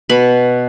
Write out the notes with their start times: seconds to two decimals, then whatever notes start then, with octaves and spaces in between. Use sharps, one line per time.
0.09 B2 B5